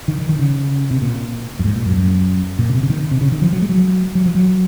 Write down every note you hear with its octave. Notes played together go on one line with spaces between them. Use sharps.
D#3
D#3
D#3
C#3
C3
A#2
F#2
G#2
A#2
F#2
F#2
A#2
C#3
C3
C#3
D#3
C3
C#3
D#3
F3
F#3
G#3
F#3
F#3
F3
F#3